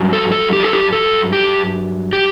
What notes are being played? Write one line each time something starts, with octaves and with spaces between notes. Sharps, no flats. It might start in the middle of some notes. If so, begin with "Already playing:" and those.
Already playing: G2 F#3
A4
A4
G4
A4
G4
A4
G4
G4